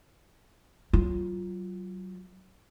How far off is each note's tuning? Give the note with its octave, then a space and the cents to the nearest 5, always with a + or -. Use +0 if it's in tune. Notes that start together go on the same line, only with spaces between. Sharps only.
F#3 +25 F4 +0